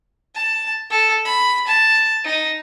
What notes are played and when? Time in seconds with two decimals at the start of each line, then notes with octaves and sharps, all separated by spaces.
0.35 A5
0.90 A4
1.25 B5
1.67 A5
2.24 D#4